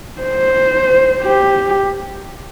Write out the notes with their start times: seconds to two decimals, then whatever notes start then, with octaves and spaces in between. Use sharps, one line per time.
0.22 C5
1.22 G4